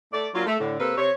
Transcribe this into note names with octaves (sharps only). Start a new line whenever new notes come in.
A3 D5
F#3 A#3 D4 F4
A3
A2 D3
C3 A#3 C4 A4 B4
C3 C#5